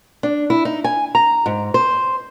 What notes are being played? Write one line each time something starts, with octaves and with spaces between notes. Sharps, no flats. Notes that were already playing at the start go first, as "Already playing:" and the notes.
D4
E4
D#4
G#5
A#5
G#2
C5